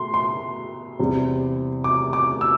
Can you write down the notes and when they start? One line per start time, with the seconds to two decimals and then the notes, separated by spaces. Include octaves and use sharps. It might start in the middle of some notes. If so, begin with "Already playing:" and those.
Already playing: B2 A3 C6
0.14 C6
0.99 E2 C3 G3
1.84 D6
2.13 D6
2.41 E6